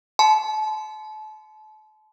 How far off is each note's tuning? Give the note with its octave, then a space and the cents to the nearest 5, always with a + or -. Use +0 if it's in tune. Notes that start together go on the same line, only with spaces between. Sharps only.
A5 -35 C6 -40